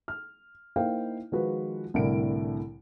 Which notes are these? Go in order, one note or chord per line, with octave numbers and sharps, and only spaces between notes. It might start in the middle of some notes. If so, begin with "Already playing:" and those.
F6
A#3 D#4 E4 C5 F5 G5
D#3 F3 G#3 F4 F#4 B4
C2 A2 D3 E4 A#4 D7